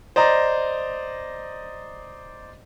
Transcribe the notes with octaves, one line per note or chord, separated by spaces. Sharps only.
C5 D5 D#5 A#5